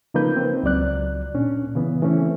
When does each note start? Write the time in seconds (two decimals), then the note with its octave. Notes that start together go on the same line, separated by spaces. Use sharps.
0.14 C#3 F3 A#3 D#4 B4 G6
0.36 C4
0.63 C#2 F#3 D5 F#6
1.34 A#2 C#4 D4
1.76 C#3 E3 B3
2.02 E3 A3 C4 C#4